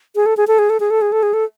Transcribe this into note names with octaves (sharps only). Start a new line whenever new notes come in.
G#4
A4
G#4
A4
G#4
A4
G#4
A4
G#4
A4
G#4
A4